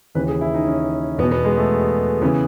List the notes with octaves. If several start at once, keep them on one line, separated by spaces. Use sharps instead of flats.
D#2 C#3 E3 B4
G#4
E4
D#4
C#4
E2 B2 B3
B3
G#3
A3
C#3 E3 B3